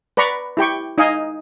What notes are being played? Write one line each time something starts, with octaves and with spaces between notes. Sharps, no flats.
B4 D5 A#5 B5 C#6
E4 G4 G5 C#6
D#4 D#5 F5 G#5